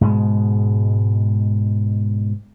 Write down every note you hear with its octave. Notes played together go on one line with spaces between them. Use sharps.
G#2 B2 G#3